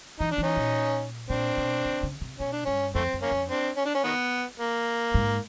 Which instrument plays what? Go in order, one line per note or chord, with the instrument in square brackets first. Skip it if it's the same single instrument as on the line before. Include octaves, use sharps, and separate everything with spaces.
[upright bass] E3 [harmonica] D#4
[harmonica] D4
[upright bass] E3
[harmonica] C#4 D#4
[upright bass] A#2
[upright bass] A#2 [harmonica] C4 D4
[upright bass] B2
C#3
C#3
C3
[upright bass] B2 [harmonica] C#4
[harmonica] D4
[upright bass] G2 [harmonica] C#4
[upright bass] F2 [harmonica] A3 C4
[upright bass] F#2
[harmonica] A#3 C#4
[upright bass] F2
[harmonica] C4 D4
C#4
D4
C#4
D#3 B3
A#3
[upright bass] G#2